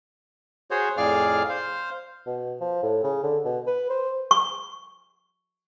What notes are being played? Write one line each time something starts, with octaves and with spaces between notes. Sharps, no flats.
F#4 G#4 C5 C#5
F2 A2 G#4 D5 F5 F6
C5 F5
B2
F3
A2
C#3
D3
B2
B4
C5
C#6